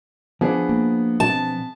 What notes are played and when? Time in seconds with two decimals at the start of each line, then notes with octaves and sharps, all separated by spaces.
0.41 F3 B3 D4 G#4
0.69 A#3
1.20 B2 C4 A5